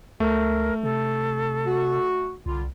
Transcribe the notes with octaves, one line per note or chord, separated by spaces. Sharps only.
C#2 A3 A#4
C3 A4
F#4
C2 D3 G3 F4